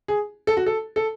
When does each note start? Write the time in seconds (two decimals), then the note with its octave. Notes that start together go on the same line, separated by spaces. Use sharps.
0.08 G#4
0.47 A4
0.57 F#4
0.66 A4
0.96 A4